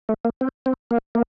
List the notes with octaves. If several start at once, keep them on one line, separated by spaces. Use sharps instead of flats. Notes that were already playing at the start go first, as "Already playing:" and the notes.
A3
A#3
C4
C4
A#3
A#3